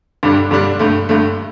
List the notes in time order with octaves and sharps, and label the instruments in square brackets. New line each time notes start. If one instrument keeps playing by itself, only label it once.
[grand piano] G2 D3 G3 D4
G2 D3 G3 D4
G2 D3 A3
G2 D3 A3